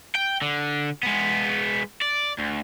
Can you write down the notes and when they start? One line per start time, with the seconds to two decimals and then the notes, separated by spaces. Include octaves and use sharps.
0.15 G5
0.42 D3
1.03 G#3 B3
2.02 D5
2.39 D2